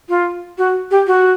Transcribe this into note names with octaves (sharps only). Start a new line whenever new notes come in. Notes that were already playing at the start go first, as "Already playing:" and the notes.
F4
F#4
G4
F#4